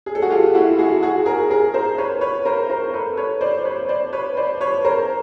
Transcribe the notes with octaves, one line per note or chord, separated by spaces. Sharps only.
G#4
A4
F#4 G#4
F4 G4
E4 F#4
F#4 G#4
F#4 G#4
G#4 A#4
G#4 A#4
A#4 C5
B4 C#5
B4 C#5
A#4 C5
A#4 C5
A4 B4
B4 C#5
C5 D5
C5
B4 C#5
C5 D5
B4 C#5
C5 D5
B4 C#5
A#4 C5